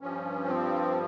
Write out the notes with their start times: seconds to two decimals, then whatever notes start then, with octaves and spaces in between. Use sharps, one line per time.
0.01 G2 F3 C#4
0.49 C4